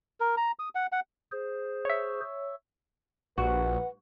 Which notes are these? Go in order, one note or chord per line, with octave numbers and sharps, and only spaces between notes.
A#4
A#5
D#6
F#5
F#5
G#4 C5
C#5 E5
A#1 F#4 B4 F#5